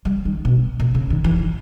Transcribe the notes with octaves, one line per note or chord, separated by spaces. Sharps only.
G3
D#3
B2
A#2
C#3
D#3
E3